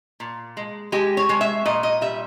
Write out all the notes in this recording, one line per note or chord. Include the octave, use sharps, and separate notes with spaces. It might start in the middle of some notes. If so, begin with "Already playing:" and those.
A#2
G#3
G#3 G4
C#5
G#3
E5
A#2 D#5
D#5
G3 E5